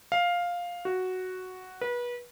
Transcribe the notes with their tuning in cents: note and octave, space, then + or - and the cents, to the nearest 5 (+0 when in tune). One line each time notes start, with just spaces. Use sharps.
F5 +5
F#4 +0
B4 -30